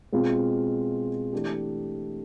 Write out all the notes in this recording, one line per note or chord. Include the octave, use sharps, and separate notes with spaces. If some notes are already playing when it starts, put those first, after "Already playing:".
B2 G#3 C4 F4
E3 A3 D4 G4